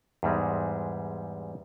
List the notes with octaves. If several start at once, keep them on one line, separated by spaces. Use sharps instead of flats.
E2 G#2 G3 G#3